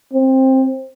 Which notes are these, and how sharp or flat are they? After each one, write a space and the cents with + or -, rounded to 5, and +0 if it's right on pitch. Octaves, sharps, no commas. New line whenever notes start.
C4 +15